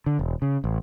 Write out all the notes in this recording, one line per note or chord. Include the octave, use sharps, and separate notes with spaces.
D3
E1
C#3
A1